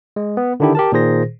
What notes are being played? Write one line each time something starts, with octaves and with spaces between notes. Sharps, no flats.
G#3
B3
D3 D#3 D4 E4 G4
G4 A#4 A5
A#2 D#3 G#4 C5 A#6